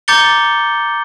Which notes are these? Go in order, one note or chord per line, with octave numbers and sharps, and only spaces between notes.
A#5 D6 G6 A6 C#7 G7